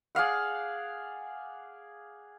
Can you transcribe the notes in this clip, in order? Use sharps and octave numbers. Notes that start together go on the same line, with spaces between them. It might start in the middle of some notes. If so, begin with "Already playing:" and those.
G#4 D5 F5 F#5